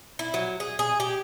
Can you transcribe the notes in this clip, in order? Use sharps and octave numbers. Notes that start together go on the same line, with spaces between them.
E4
F#3
G#4
G#4
G4